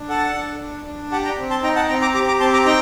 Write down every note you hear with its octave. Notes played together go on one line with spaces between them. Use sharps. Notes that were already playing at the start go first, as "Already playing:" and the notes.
Already playing: D4
A4 F#5 A5
D4
D4
D4
G4 F#5 A5
G5 A#5
C4
A5 C6
D#4 G5 A#5
F#5 A5
C4 G5 A#5
A#5 D6
G4 A#5 D6
A#5 D6
C4 A5 C6
A#5 D6
D#4 G5 A#5